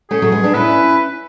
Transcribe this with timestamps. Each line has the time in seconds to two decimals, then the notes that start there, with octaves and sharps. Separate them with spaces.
0.10 A3 C#4 G#4
0.22 F#3 A3
0.32 G#3 B3
0.43 B3 D4
0.54 C#4 E4 B4